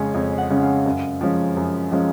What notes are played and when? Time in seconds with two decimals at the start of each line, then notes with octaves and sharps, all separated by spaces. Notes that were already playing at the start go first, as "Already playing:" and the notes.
Already playing: F2 C#3 G#3 C#4 C#5
0.14 F2 G#5
0.38 F#5
0.50 C#3 G#3 C#4
0.62 F5
0.86 F#2
1.21 F3 G#3 C#4
1.57 F#2
1.91 F3 G#3 C#4